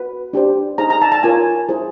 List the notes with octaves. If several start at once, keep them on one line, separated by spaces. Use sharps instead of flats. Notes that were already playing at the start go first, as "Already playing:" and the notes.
Already playing: F#4 B4
D4 G4 C5
D#4 G#4 C5 A#5
A#5
A5
A5
F4 A#4 C#5 G#5
E4 G#4 C5